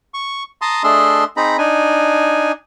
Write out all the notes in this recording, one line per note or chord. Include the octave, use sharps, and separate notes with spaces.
C#6
A5 A#5 C6 D#6
A3 D4 G#4 D#5 E5 C6
C4 D#4 G#4 A#5 B5
D4 D#4 G#5